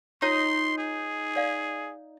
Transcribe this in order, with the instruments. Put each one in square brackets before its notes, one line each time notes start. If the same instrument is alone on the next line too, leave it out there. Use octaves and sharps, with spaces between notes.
[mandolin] D#4 [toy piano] F4 C#5 A#5 [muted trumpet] C6
[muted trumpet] G#4
[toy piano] D5 F5